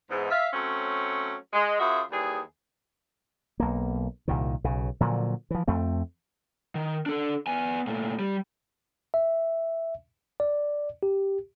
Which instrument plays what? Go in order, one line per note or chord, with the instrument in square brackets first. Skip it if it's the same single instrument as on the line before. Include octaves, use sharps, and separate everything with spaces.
[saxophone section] E2 G#2
E5 F5
F#3 A3 C4 C#4
G#3
F#2 F4 F#4 G#4 E5
D#2 E3 G3 G#4
[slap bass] B1 A#3
C2 A#2 D#3
B1 C#3
A#2 D3 F3 F#3
E3 F3
F2 A3 C4
[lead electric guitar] D#3
D4 A4
B3 G#5
A#2 A3
G3
[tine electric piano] E5
D5
G4